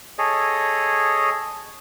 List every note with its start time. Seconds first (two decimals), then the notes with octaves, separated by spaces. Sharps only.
0.18 G#4 A4 C#5 D#5